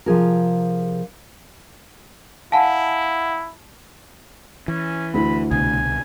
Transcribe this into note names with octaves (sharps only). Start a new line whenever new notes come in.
C3 F3 G#4 A#4
E4 F5 F#5 G#5 A5
E3 C#4
D2 E4 B5
C2 B2 D3 G#5